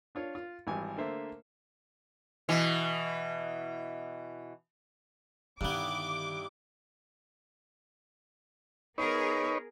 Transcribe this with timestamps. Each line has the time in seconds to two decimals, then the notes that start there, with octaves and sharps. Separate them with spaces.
0.15 D4 F4 C#5
0.35 F4
0.67 G#1 E3 G3 G#5
0.98 D3 A3 A#3 C5 E5
2.49 B2 E3
5.61 G2 D3 D#3 G3 B3 D#4 E4 D6
8.98 B3 D#4 G#4 A#4 B4 C#5